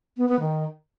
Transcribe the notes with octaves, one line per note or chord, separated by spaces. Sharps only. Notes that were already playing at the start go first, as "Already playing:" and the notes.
B3
B3
D#3